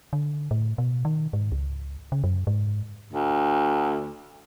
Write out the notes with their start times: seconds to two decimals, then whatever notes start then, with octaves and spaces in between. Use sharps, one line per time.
0.13 D3
0.51 A2
0.78 B2
1.05 D#3
1.33 G#2
1.52 C#2
2.12 C#3
2.24 F#2
2.47 G#2
3.13 D2